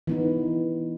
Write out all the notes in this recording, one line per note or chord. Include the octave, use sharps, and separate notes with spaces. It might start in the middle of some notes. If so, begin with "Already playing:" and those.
E3 B3 D#4